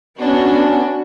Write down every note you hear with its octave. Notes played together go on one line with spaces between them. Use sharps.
B3 C#4 D4 F#4